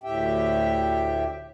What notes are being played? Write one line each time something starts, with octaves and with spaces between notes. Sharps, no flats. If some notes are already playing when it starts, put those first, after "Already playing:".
D2 A2 G4 E5 G5